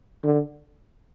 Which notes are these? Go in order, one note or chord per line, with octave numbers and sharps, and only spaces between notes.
D3